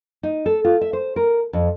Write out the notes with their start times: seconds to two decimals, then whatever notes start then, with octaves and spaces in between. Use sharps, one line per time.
0.23 D#4
0.46 A4
0.64 F4
0.81 E5
0.93 C5
1.16 A#4
1.53 F2